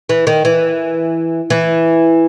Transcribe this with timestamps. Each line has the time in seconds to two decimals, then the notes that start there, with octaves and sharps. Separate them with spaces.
0.09 E3
0.27 D#3
0.45 E3
1.50 E3